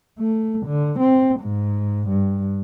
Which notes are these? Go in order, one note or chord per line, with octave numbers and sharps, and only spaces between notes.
A3
D3
C4
G#2
G2